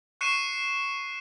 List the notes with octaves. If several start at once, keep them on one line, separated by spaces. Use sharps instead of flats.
C#6 F#6 C7 C#7 D#7 E7